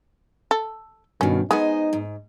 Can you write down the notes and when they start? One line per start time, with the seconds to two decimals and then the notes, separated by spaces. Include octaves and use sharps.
0.51 A4
1.21 G2 B2 D#3 C#4
1.51 G#3 B3 D#4 C5 D#5 G#5
1.93 G#2